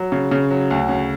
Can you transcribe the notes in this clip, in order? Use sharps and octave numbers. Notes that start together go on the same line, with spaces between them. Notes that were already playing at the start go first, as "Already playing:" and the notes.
Already playing: F#3
C#3
C#3
F#3
D2
C#3